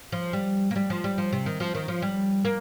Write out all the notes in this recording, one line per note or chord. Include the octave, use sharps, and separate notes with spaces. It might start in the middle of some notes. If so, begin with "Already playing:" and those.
F3
G3
A#3
G3
F3
G3
F3
C3
D#3
F3
D#3
F3
G3
A#3